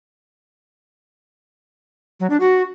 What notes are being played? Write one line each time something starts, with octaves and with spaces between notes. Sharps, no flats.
F#3
D4
F#4